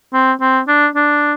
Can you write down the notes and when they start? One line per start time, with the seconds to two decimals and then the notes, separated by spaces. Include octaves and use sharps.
0.13 C4
0.41 C4
0.68 D4
0.95 D4